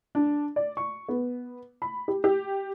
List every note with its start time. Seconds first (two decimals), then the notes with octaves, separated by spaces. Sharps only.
0.15 D4
0.56 D5
0.77 C#6
1.09 B3
1.82 B5
2.08 G4
2.24 G4